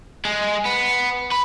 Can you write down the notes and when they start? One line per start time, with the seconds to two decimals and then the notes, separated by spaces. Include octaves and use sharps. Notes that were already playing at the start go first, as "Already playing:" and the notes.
0.25 G#3
0.65 B3
1.32 B4